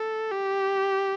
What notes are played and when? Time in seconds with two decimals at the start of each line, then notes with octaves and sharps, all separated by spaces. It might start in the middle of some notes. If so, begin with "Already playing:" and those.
Already playing: A4
0.31 G4